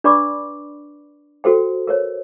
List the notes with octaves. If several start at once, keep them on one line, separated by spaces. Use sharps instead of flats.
D4 B4 D5 B5 C#6 D6
F#4 A4 C5 G5
A#4 C5 C#5